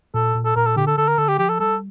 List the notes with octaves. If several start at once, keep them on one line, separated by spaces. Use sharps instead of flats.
A#2 A4
A#2
A4
A#2 A#4
A4
D3 G4
A4
D3 A4
A#4
D3 A4
G4
F3 G4
A4
G3 A4